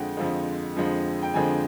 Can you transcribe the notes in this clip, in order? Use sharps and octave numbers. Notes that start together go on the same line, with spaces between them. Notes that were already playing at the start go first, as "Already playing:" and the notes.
Already playing: F2 D3 F3 G#3 F#5 G5
F2 D3 F3 G#3
F2 D3 F3 G#3
G5
F2 D3 F3 G#3 G#5